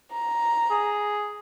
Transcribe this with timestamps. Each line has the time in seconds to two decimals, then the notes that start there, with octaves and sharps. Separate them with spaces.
0.13 A#5
0.71 G#4